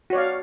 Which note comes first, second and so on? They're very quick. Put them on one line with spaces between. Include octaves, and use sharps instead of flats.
F#4 C#5 D5 F5